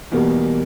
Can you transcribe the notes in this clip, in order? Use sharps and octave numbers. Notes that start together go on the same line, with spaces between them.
E2 B2 G3 A#3